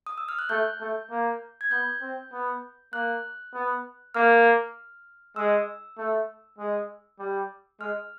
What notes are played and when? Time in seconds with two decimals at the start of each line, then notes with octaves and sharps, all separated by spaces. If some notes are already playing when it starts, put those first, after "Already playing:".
0.07 D#6
0.18 E6
0.29 F6
0.39 F#6
0.49 A3 G6
0.81 A3
1.11 A#3
1.61 G#6
1.71 B3 G6
2.02 C4
2.33 B3
2.93 A#3 F#6
3.54 B3
4.14 A#3 F6
5.36 G#3 E6
5.98 A3
6.58 G#3
7.19 G3
7.80 G#3 F6